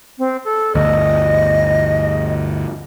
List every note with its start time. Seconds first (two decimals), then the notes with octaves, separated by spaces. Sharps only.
0.19 C4
0.44 A4
0.75 G1 D2 D#5